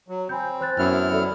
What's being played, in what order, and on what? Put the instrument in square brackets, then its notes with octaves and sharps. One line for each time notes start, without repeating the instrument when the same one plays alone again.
[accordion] F#3
[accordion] C4 [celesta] G#5 B5 G6
[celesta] C5 F#6 A6
[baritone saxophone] F#2 [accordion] B3 E4 F6
[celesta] A4 D5 E5